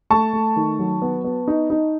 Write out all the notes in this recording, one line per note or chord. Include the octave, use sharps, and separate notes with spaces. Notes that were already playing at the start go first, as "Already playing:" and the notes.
A3 A5 C#6
A3
D#3
F#3
B3
B3
D#4
D#4